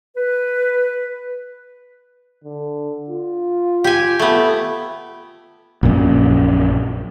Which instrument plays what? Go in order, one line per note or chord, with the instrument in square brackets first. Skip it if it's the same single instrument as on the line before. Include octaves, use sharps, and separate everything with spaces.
[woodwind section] B4
[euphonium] D3
F4
[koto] G4 G#5
A3 B3
[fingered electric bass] A#1 F#2 A#2 C#4